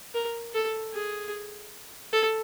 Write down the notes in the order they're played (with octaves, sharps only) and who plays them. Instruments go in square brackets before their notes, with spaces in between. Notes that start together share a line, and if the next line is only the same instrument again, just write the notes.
[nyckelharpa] A#4
A4
G#4
A4